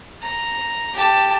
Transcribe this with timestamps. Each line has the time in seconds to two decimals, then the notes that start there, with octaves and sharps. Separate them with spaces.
0.22 A#5
0.94 G4 A5